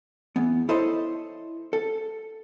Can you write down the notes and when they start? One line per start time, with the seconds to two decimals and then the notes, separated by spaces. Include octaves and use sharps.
0.36 E2 B3
0.69 E4 A4 C5 C#5 D#5
1.73 A4